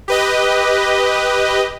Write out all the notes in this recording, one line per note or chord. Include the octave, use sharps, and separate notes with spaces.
G4 B4 D#5